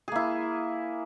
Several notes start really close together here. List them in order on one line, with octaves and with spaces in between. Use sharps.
G#4 A#3 E4